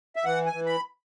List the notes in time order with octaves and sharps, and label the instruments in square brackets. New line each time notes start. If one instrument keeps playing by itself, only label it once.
[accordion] E5
E3 F#5
G#5
E3
B5